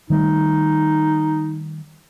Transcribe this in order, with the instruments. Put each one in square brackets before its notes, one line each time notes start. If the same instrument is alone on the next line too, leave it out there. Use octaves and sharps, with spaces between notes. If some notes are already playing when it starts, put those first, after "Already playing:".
[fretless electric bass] D#3 G3 A3 [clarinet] D#4